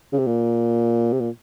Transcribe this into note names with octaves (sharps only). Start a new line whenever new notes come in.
C#3
C3
A#2
C3
A#2